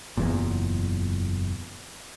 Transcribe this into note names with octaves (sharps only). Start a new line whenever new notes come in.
F#1 E2 A#2